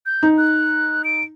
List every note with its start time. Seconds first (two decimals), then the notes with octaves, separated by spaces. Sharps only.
0.06 G6
0.23 D#4
0.38 F#6
1.04 D7